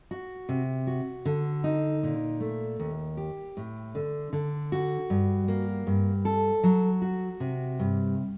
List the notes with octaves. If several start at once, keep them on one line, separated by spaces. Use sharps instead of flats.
F#4
C3
F#4
D3
D#4
A#2
A3
D#2
G4
A2
D3
D3
F#4
G2
A#3
G2
A4
F#3
F#4
C3
G2